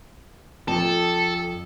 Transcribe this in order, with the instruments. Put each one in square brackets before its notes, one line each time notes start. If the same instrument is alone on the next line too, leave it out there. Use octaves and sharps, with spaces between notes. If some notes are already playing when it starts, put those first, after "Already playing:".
[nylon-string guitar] F2 [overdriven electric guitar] A4